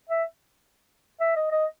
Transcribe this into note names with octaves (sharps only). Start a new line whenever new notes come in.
E5
E5
D#5
D#5